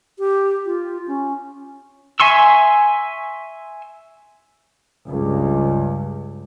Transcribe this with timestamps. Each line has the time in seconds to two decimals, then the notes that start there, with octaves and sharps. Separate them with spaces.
0.19 G4
0.66 F4
1.07 C#4
2.20 E5 G#5 C6 C#6 E6
5.08 C#2 G2